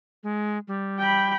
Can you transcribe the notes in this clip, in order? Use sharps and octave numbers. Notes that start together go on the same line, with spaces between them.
G#3
G3
G5 B5